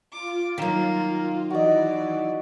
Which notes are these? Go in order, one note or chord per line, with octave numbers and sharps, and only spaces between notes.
F4 D6
D#3 F#3 A#3
E3 F#4 D5 D#5